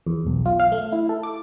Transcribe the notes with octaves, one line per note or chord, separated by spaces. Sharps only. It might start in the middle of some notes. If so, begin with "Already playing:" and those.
E2
B1
F4
F5
A3
E4
A4
D6